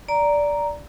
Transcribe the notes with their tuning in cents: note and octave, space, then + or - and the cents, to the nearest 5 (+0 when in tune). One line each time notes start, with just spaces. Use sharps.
D5 -10 A#5 +0